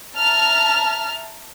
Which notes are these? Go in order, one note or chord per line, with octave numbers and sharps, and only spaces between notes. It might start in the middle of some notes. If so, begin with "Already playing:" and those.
E5 A5 A#5 F6